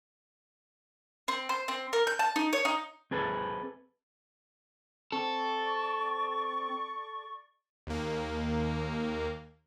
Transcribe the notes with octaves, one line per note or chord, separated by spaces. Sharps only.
C4
C5
C4
A#4
G6
A5
D#4
C#5
D#4
C4 G#4 A4 B4
C4 A4 D5 C#6
D#2 A#3